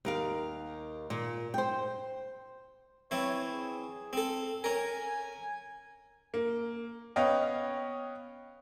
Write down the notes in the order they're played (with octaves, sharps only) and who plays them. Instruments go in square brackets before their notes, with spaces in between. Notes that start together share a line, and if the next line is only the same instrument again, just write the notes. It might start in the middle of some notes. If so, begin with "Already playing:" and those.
[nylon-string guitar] D#2 A#4 F5
A#2
C5 G5
[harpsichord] E3 C4 E4 [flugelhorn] C#5
[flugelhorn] G#4
[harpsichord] C4 A4
[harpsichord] C#4 A#4 [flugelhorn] G#5
[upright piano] A#3
B3 C#4 C#5 D#5 F5 G5